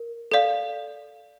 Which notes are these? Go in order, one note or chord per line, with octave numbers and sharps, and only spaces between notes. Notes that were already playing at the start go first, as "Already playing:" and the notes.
Already playing: A#4
A4 D5 F5